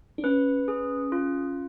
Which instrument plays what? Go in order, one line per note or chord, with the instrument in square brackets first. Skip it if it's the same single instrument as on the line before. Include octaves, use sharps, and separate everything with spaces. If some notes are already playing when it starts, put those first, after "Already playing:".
[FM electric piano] D4
[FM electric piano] C#4 [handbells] B4
[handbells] G#4
F4